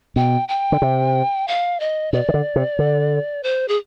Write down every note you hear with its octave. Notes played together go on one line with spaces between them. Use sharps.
B2 G5
G5
D3
C3
F5
D#5
B2 D5
D#3
D3
C3
D3
C5
G#4